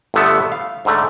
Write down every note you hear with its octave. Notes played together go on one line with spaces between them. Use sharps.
G1 D3 A3 B3 E5
F5
G#2 D3 A3